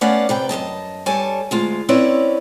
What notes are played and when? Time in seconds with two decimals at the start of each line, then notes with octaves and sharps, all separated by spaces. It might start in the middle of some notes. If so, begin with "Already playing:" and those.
0.01 A3 B3 C#4 D5 F5 F#5
0.29 C3 B4 G5
0.49 F#2 F3 D#5 A5
1.06 G2 G3 A4 C#5 G#5 A5
1.51 D2 G#3 F4
1.89 C4 C#4 E4 B4 C#5 D5